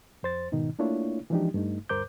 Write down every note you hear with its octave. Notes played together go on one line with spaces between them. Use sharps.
F2 C5 A6
G#2 B2 D#3 D#4
A3 A#3 D4 E4 F4 C#5
E3 F3 G#3 D4 D#4 G4
G2 A3 D#4
D2 G2 A#4 C5 D6 G6